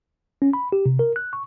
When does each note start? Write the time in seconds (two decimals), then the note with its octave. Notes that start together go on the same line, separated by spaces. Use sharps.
0.42 C#4
0.53 B5
0.72 G4
0.86 C3
0.99 A#4
1.16 F#6
1.33 C#6